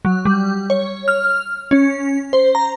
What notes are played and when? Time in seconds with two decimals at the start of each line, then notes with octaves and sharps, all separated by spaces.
0.05 F#3
0.25 G3
0.70 C#5
1.08 F6
1.71 C#4
2.33 C5
2.55 A#5